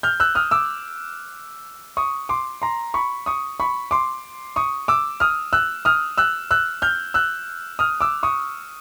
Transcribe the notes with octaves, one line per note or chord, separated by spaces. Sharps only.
F6 G6
E6 F#6
D#6 F6
D6 E6
C#6 D#6
C6 D6
A#5 C6
B5 C#6
C#6 D#6
B5 C#6
C6 D6
C#6 D#6
D6 E6
D#6 F6
E6 F#6
D#6 F6
E6 F#6
E6 F#6
F6 G6
E6 F#6
D#6 F6
D6 E6
C#6 D#6